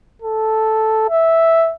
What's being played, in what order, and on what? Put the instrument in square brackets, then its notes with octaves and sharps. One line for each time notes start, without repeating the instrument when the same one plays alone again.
[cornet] A4
E5